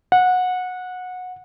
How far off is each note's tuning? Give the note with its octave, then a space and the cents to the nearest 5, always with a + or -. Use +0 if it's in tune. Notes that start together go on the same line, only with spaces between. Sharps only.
F#5 -20